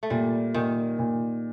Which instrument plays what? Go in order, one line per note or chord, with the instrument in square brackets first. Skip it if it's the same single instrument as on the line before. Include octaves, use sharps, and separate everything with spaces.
[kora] A3
[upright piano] A#2 [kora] G3
[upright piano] A#2 [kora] D#3
[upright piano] A#2